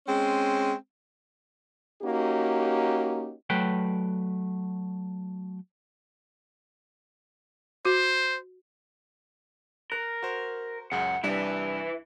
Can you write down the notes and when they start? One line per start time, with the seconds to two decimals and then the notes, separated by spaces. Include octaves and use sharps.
0.06 G#3 C4 C#4
2.02 A#3 C#4 D#4 F#4 G4
3.50 F#3 A3 B4 G5
7.85 F#4 C5
9.92 A#4 F#6
10.23 F#4 C5
10.92 C#2 F#2 C#3 F#5
11.23 C2 G3 D4 E4 B4